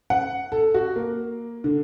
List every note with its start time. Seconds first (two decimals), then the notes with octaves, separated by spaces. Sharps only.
0.10 F#5
0.52 A4
0.74 F#4
0.96 A#3
1.64 D3